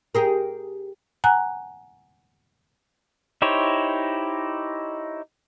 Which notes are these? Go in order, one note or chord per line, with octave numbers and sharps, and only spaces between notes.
G4 G#4 A#4
F#5 G#5 A#5 F#6
D#4 E4 G4 C5 C#5